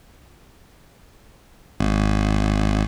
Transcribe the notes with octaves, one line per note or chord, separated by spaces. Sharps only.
G#1